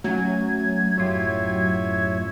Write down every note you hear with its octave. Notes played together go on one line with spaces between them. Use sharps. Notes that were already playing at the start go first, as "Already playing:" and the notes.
F#3 A3 C#4 G#5 G#6
F#2 A2 F4 G4 C#5 E5